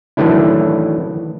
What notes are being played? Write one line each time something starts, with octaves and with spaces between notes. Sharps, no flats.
D#3 E3 F#3 A3 D4 E4